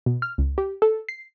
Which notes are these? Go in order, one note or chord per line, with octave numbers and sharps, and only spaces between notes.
B2
F6
C#2
G4
A4
C7